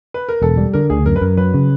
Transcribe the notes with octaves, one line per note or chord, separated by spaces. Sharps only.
B4
A#4
E1 A4
G3
D3 A#4
D2 G#4
F#2 A#4
B4
F#2 A#4
F#3 B4
C#3